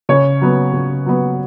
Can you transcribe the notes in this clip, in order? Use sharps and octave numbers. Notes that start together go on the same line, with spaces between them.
C#3 C#5
F#3 B3
C#3
F#3 B3